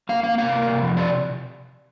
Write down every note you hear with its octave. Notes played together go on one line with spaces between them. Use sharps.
A#3 F5
A#3 F5
C3 F5
A#3
C3
F3
C3 D5